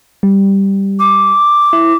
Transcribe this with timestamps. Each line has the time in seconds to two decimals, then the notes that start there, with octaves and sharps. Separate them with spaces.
0.23 G3
1.00 D6
1.73 E4